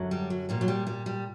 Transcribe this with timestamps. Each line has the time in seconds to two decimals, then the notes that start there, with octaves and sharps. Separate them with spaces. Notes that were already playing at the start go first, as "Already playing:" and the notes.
Already playing: F#2 D3 F#3
0.11 G3
0.30 F#3
0.49 A#2 F#3 G3
0.61 F#3
0.68 G3
0.87 G3
1.06 G3